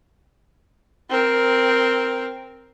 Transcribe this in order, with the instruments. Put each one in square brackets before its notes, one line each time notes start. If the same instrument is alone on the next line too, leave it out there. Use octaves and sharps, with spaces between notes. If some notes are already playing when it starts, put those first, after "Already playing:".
[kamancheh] C4 A#4